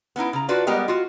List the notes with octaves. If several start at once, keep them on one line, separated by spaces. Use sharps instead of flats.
B3 C#4 D#4 E4
C#3 A#5
D4 F4 F#4 B4 D5
G3 G#3 B3 G4 A#4 D#5
F4 F#4